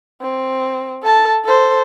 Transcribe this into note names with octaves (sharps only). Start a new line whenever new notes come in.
C4
A4 A5
A4 C5